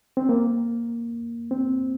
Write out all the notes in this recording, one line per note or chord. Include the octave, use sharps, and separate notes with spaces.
C4
A#3
C4